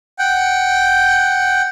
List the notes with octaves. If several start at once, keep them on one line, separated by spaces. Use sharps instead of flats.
F#5 G5